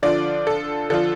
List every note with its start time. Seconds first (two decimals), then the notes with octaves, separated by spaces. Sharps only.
0.03 D3 F3 D4 F4 D5
0.47 A4
0.90 D3 F3 D4 F4 A4